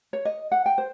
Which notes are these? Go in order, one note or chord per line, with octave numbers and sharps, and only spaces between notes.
C#5
D#5
F#5
G5
C5